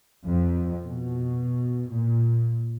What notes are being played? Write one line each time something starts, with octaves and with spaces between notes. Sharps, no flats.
F2
B2
A#2